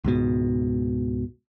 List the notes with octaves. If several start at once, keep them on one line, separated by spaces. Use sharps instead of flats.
C#2 G#2 B2